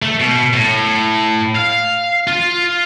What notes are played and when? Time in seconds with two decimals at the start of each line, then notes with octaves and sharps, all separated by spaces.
0.02 A3
0.20 B2
0.53 A2
1.56 F5
2.27 F4